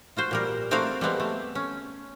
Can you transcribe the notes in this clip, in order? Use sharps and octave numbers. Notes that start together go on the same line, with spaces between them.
F4 F#4 C5
A#2 G3 A#4
A3 C4 F#4 A#4 D5 F5
G3 G#3 B3 C4
A3
C#4